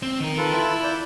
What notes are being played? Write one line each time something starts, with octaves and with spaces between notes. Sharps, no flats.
C4
D#3 A#4
F4 A4 B4
E4
D5 G6